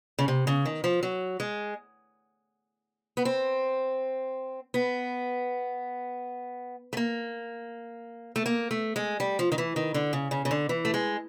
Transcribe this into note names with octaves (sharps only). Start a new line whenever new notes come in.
C#3
C3
C#3
D#3
F3
F#3
G#3
B3
C4
B3
A3
A#3
A3
A#3
A3
G#3
G3
F3
D#3
E3
D#3
D3
C#3
C#3
C#3
D3
E3
A3
G#3